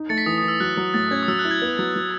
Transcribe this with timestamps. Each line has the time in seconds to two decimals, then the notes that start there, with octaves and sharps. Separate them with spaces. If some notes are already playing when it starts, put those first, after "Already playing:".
Already playing: D#4
0.09 A3 A6 C#7
0.18 B6
0.26 E3 D#6
0.38 D#6
0.43 E3
0.48 E6
0.60 F#3 F#6
0.77 F#3
0.94 A2 A6
1.11 C#4 G#6
1.23 D#6
1.28 F#3 E6
1.39 F#6
1.45 E4
1.51 G#6
1.62 B3
1.79 F#3
1.96 F#3